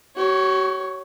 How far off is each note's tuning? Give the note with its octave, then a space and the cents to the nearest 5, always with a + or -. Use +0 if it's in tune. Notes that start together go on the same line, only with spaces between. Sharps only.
F#4 +45 C#5 +0